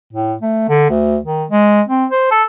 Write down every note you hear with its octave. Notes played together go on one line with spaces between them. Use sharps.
A2
A3
D3
D2
D#3
G#3
C4
C5
A4